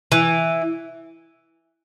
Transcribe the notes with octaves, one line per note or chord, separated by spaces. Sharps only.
E3